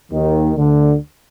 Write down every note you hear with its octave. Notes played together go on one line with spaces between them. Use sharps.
D#2 D#3
D2 D3